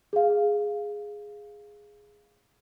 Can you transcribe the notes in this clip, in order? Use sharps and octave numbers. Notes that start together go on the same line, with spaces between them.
G#4 F5